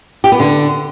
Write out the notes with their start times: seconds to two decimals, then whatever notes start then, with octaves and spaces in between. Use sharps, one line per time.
0.24 G4
0.32 B3
0.40 D3